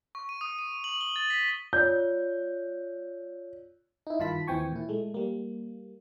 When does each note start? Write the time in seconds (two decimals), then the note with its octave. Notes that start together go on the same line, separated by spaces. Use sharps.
0.15 C#6
0.29 D#7
0.41 D#6
0.59 D#7
0.84 F#7
1.01 G7
1.16 A6
1.30 B6
1.73 F4 C#5 D5 G6
4.07 D#4 E4
4.19 G2 D#3 F4 A5 B5 B6
4.48 D#2 E3 C4 G5 G#5 C#6
4.72 A#2 E4
4.89 G#3 A3
5.14 G3 A#3